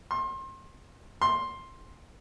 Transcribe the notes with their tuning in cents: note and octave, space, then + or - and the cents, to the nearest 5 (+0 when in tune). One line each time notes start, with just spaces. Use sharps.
C6 +30
C6 +10